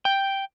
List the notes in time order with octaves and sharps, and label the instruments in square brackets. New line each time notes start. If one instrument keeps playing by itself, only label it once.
[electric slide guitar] G5